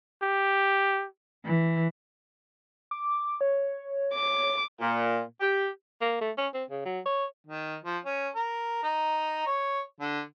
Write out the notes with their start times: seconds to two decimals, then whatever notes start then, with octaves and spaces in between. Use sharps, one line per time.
0.22 G4
1.45 E3
2.91 D6
3.41 C#5
4.14 D6
4.81 A#2
5.41 G4
6.02 A#3
6.21 A3
6.38 C#4
6.54 C4
6.70 C#3
6.85 F#3
7.05 C#5
7.47 D#3
7.85 F3
8.05 C#4
8.36 A#4
8.83 D#4
9.46 C#5
10.01 D3